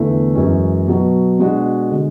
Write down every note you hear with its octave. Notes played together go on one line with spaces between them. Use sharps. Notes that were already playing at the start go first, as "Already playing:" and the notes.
Already playing: E2 D3 A3 E4
F#2 E3 G#3 C#4
B2 F#3 B3
B2 G#3 D4 F#4
D3 G#3